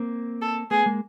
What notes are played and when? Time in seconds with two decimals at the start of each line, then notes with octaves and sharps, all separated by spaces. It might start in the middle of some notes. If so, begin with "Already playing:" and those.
Already playing: A#3 C4
0.42 A4
0.71 A3 B3 G#4
0.86 G#3 A#3